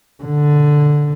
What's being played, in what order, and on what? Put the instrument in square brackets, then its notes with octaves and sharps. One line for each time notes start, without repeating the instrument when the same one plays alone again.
[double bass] D3